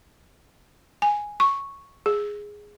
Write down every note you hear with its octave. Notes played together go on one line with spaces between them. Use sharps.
G#5
C#6
G#4